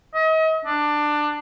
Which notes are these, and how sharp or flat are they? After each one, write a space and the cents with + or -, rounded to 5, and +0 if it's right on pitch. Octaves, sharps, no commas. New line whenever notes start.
D#5 +40
D4 +15